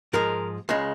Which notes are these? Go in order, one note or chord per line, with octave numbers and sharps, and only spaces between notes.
G#2 F3 G#3 A#4
C#2 C#3 G#3